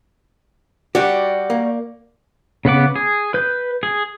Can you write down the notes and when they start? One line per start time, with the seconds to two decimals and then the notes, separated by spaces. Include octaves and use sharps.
0.95 G3 F#4 G4 D5
1.50 A#3
2.65 C#3 B3 F#5 D6
2.96 G#4
3.34 B4 G6
3.83 G#4